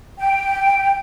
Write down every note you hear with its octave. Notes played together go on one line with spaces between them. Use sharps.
G5